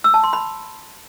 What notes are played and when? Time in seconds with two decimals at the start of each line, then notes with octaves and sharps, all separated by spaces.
0.04 E6
0.14 A5
0.24 C6
0.33 B5